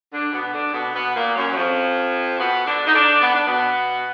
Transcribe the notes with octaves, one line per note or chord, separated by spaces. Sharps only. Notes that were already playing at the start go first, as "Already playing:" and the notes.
D3 D4
B2 B3
D3 D4
B2 B3
B2 B3
A#2 A#3
F#2 F#3
F#3
F2 F3
B2 B3
D3 D4
D#4
D3 D4
B3
D4
B2 B3